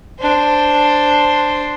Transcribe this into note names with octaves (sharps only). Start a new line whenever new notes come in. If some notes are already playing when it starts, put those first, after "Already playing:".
D4 C5